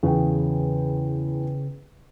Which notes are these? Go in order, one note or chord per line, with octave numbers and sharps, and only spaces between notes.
E2 C#3 G5